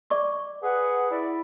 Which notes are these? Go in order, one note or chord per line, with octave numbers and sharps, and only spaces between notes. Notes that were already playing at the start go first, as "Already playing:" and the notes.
D5 C#6 D6
G#4 B4 F#5
E4 D5